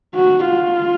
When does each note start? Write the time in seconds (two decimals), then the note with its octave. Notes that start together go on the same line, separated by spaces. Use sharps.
0.15 F#4
0.45 F4